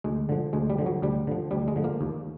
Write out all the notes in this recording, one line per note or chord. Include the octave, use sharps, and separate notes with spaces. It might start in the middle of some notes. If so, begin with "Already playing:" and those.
D2 G#3
D3 F3
D2 G#3
G3
D3 F3
F#3
D2 G3
D3 F3
D2 G3
G#3
D3 F3
A#3
D#2